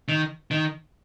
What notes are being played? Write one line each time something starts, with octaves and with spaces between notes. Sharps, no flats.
D#3
D#3